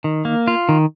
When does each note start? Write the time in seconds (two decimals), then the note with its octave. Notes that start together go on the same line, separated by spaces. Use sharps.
0.04 D#3
0.25 A#3
0.48 F4
0.69 D#3